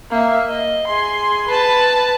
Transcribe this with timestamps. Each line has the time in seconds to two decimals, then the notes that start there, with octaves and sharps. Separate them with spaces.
0.11 A#3 E5
0.48 D#5
0.87 G#4 C6
1.48 B4 A5